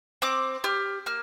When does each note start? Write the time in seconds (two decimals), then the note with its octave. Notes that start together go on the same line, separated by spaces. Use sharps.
0.22 C4 D6
0.64 G4 F6
1.06 A#3 F6